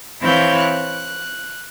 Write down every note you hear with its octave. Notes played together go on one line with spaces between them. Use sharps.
E3 C4 E4 C#5 F5 G6
F#6